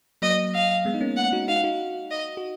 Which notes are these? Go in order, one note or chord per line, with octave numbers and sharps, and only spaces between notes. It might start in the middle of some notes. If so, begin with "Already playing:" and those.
F#3 A#3 D#5
F5
G#3 B3
D#4
A#3 C#4
F#5
D#4 F#4
D#4 F#4 F5
D#4 F#4
D#5
F#4